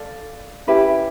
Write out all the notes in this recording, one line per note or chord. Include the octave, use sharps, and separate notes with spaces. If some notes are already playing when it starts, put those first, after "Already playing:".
Already playing: A4 D5 F5
C#4 E4 G4 B4